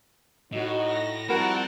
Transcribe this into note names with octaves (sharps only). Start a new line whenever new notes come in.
A2 D#4 F#4 D#5
A#6
F3 G3 C4 E4 F#4 A#4 F#5 A5